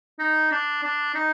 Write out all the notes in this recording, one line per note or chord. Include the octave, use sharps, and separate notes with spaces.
D#4
D4
D4
D#4